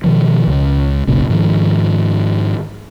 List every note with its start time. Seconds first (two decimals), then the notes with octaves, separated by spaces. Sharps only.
0.04 B2 D#3 F3
0.47 C#2
1.07 F#1 B1 A#2 C#3
1.30 G#2 D#3 F3